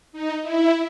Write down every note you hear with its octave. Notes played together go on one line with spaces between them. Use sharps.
D#4
E4